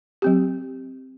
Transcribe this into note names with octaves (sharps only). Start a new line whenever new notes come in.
F#3 C4 G4